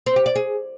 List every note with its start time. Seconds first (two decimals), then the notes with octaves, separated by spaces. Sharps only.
0.06 C4
0.16 G4
0.26 D5
0.36 G#4